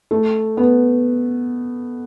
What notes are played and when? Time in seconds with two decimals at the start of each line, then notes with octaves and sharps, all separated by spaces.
0.11 A3
0.57 B3